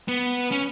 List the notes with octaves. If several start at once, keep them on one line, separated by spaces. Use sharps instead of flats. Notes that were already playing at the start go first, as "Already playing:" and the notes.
B3
C#4